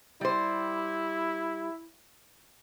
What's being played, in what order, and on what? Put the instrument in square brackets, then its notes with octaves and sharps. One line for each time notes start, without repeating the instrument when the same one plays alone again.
[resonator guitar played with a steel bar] G3 C5 [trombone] E4